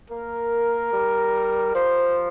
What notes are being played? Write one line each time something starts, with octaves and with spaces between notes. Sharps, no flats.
A#3 A#4
G3
F3 C5